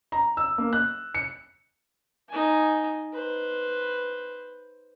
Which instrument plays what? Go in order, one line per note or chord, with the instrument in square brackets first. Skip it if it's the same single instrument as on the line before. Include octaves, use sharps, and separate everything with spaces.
[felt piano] A#5
E6
A#3
F#6
C#7
[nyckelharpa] D#4 G#5
B4 C5